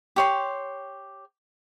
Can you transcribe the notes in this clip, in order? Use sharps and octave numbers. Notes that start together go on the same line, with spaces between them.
G4 C#5 C6